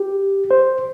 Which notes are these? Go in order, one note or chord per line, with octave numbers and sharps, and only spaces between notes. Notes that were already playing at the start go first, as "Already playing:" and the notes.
Already playing: G4
C5